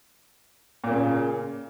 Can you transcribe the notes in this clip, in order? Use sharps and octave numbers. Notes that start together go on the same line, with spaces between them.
A#2 C#3 A#3